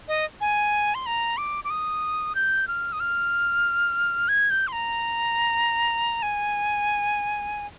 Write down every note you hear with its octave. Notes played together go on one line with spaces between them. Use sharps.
D#5
G#5
C6
A#5
D6
D6
D#6
G6
F6
D#6
F6
G#6
G6
C6
A#5
G#5